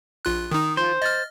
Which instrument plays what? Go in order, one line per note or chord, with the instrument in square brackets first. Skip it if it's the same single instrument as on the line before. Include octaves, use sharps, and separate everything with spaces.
[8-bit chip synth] A#1 F4 F#6
[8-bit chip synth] D#3 D#4 [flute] D#6
[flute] F4 [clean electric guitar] C5
[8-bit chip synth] D#5 F6 [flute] A6